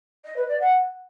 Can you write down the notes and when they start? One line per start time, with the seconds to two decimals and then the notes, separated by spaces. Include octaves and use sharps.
0.24 D#5
0.36 B4
0.48 D5
0.60 F#5